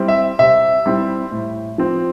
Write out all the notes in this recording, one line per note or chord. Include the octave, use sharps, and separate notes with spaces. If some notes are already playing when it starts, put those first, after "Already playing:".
Already playing: G3 C4 E4
E5
C3 E5
G3 C4 E4
A2
F3 C4